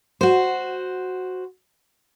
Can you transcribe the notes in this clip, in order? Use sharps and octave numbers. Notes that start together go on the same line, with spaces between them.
F#4 C5